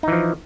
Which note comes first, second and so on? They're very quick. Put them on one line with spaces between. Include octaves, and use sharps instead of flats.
D#4 E3 F3